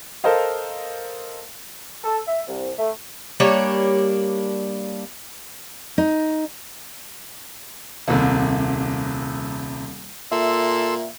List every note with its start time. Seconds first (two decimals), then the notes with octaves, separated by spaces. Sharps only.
0.24 A4 A#4 C5 D#5 F5
2.04 A4
2.27 E5
2.47 C2
2.79 A3
3.40 G3 A#3 D4 C#5
5.98 D#4
8.08 D#1 C2 C3
10.32 A#2 A4 E5 C6 E6